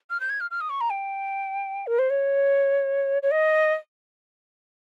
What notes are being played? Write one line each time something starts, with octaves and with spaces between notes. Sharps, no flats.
F6
G6
G#6
F6
F6
D#6
C#6
A#5
G5
A#4
C5
C#5
C#5
D#5